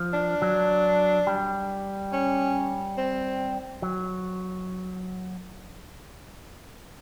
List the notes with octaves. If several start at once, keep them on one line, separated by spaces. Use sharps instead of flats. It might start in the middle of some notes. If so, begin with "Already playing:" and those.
Already playing: F3
D4
F#3
G3
C#4
C4
F#3